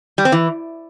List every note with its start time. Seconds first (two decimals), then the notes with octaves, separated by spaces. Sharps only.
0.18 G3
0.25 C4
0.32 E3